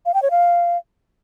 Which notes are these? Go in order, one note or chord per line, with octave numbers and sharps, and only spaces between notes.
F5
G5
C#5
F5